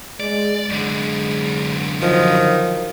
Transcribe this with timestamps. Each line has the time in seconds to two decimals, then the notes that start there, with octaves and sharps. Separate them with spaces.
0.20 G#3 D5
0.70 F#2 D3 G#3
2.02 D#3 F3 F#3